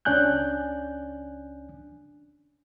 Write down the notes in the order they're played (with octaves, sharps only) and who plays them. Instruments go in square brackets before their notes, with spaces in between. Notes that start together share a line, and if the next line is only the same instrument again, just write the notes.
[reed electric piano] C#2 C#4 D4 G#5 F#6 G6